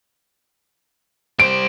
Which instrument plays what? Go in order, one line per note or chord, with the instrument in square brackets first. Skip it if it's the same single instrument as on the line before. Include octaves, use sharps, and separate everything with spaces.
[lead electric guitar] G3 C5 [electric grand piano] D7